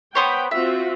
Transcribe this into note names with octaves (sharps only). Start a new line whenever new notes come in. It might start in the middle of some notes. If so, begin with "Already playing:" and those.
B3 C5 C#5 G5 B5
C4 F4 F#4 E5